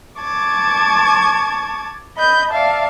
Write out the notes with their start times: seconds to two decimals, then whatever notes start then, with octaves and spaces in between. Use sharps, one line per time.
0.20 A5 C#6 D6 G#6
2.17 D#5 B5 G6
2.51 D5 E5 F5 A5